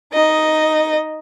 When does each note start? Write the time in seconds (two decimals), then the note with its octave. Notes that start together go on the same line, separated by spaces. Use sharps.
0.13 D#4 D#5